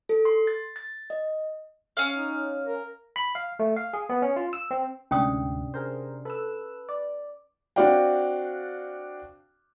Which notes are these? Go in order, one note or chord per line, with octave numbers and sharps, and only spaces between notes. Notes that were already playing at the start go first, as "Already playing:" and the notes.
A4
C6
A6
A6
D#5
C#4 F5
D#4
A#4
B5
F5
A3
F5
G#4
B3
C#4
F4
E6
C4
D2 G#2 C3 C#4 D4 G5 D#6
G#4 A#4 C5
A4 B4 E6
D5
C4 D4 F#4 D5 F5 G5